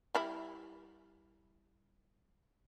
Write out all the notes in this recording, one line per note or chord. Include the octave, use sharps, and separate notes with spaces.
G3 E4 B5